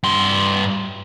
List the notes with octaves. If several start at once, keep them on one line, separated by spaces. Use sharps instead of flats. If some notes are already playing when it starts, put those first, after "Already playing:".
G2 C6